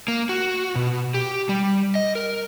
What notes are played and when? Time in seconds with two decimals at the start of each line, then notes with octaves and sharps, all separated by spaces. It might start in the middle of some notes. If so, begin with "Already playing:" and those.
0.08 A#3
0.29 F#4
0.75 B2
1.14 G4
1.49 G3
1.95 D#5
2.15 A#4